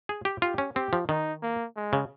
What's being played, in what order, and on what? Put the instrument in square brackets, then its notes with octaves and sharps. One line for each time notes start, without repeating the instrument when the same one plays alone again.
[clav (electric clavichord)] G#4
G4
[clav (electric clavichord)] F4 [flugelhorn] G4
[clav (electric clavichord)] C#4
[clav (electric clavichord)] C4 [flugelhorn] G4
[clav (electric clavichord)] F3
[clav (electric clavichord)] D#3 [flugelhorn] D#4
[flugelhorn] A#3
G#3
[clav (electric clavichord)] C#3